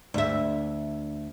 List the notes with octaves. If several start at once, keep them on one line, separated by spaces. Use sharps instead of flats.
D2 E5